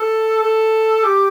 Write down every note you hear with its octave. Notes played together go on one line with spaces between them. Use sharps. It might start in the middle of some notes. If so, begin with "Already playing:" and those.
Already playing: A4
A4
G4